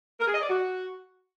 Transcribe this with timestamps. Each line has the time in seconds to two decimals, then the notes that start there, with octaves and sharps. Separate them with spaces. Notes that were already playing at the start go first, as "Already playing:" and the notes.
0.20 A#4
0.27 G#4
0.34 D#5
0.41 D5
0.48 F#4